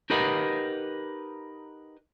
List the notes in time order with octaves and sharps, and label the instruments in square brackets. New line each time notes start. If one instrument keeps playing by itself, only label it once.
[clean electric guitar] D#4 G4 A#4 B4 D#5 F#5